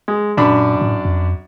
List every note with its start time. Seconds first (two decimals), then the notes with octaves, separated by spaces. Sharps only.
0.08 G#3
0.37 F#2 A#2 D4 B5
0.81 A2
1.05 F2